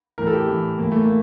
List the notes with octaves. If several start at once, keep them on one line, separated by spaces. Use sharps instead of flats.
A2 E3 A#4
A4
G4
A2 E3
A2 E3 A#3
A3
A#3